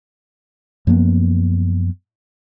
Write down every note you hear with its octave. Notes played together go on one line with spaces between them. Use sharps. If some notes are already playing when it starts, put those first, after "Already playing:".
F#2 F3 A#3 B3